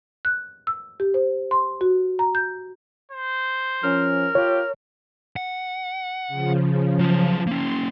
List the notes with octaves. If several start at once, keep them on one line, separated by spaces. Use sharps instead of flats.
F#6
E6
G4
C5
C6
F#4
A#5
G6
C5
F3 C#4 A#4
F4 G4 C#5
F#5
C#3 F3
F#3 F4
A#3 C#4 C6